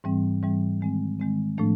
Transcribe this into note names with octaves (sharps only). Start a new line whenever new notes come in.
G#2 E3 G3 C4
G#2 E3 G3 C4
D#3 G#3 C4
D#3 G#3 C4
A2 F3 A3 D4